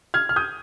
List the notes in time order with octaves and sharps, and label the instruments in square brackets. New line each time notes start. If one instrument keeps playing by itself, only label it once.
[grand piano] F6 G#6
F6
D#6 G6